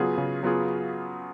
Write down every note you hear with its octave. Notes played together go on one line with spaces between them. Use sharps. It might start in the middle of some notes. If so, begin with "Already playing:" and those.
Already playing: C#3 F#3 B3 F4 G#4
C#3
F#3 B3 F4 G#4